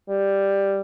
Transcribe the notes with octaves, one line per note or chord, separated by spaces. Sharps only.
G3